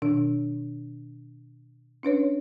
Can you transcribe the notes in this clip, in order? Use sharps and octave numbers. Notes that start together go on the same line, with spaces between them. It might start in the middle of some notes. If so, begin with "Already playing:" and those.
B2 D#3 D4
C#4 D4 B4 C#5